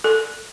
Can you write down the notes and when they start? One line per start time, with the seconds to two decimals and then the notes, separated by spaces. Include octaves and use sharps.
0.04 A4